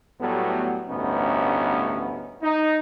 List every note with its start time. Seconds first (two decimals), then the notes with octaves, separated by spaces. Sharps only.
0.20 A2 F#3 G3 A3 B3
0.88 A1 D2 G2 B3 C#4 D#4
2.42 D#4